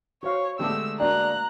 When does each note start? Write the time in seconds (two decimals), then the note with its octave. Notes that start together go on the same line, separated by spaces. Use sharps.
0.23 F#4 C5 C#5 F5
0.59 D3 G#3 A3 B3 D4 G4 E6
1.00 A#3 D4 F#4 G5 A#5 F#6